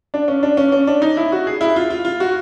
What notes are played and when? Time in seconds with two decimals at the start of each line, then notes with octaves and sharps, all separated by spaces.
0.14 D4
0.28 C#4
0.43 D4
0.57 C#4
0.72 C#4
0.87 D4
1.02 D#4
1.17 E4
1.32 F#4
1.47 G#4
1.61 E4
1.76 F4
1.90 F4
2.05 F4
2.20 F#4